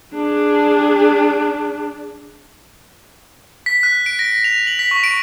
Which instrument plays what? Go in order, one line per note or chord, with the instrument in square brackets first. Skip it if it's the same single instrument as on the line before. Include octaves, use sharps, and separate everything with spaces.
[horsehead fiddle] D4 G#4
[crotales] B6
F#6
D7
A#6
F7
F#7
B6
C#6
D7